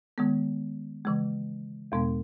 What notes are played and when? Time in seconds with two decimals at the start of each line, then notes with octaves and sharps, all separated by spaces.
0.18 D#3 G#3 B3
1.05 C#3 E3 G#3
1.92 E2 B2 G#3 B3